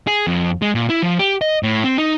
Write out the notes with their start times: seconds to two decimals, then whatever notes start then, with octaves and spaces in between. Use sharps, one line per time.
0.07 G#4
0.27 F2
0.62 G#3
0.75 A#2
0.89 E4
1.02 F3
1.19 G4
1.41 D#5
1.63 A2
1.84 C4
1.98 D#4